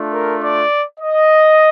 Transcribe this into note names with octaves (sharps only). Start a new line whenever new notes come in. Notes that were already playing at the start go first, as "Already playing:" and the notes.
Already playing: A3 D4 F4
A#4
D5
D#5